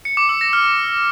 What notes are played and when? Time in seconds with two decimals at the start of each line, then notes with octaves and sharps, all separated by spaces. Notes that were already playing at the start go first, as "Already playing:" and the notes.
0.05 C#7
0.17 D6
0.29 E6
0.41 A#6
0.53 F6